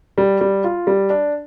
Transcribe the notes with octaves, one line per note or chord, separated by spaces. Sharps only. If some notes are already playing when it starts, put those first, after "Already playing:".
G3
G3
F4
G3
D4